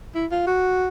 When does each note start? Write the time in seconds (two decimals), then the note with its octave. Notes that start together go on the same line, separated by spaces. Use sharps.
0.15 E4
0.31 F4
0.47 F#4